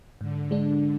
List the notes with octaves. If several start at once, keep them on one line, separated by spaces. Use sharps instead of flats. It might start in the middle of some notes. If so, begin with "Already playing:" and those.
G#2 D3
G#3 D4